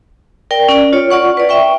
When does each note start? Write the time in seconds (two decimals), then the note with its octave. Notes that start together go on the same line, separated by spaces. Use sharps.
0.51 A#4 D5 G5
0.69 C#4 D5
0.93 F4 C#5
1.10 F4 D5 F#5 C#6
1.37 B4 D5
1.49 E5 G5 C#6